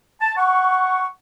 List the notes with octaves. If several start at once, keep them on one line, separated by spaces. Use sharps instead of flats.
A5
F#5 C#6